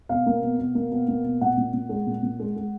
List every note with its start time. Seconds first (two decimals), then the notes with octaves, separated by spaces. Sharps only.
0.09 B2 F5
0.26 A#3
0.42 B2
0.59 B2
0.75 A#3
0.91 B2
1.08 A#3
1.24 B2
1.41 A#2 F#5
1.57 A#2
1.73 A#2
1.89 G#3
2.07 A#2
2.23 A#2
2.40 G#3
2.56 G#3